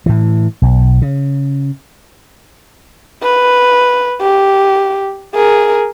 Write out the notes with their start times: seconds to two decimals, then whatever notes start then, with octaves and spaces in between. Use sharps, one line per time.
0.06 A2 E3
0.62 B1
1.02 C#3
3.23 B4
4.21 G4
5.35 G#4 A#4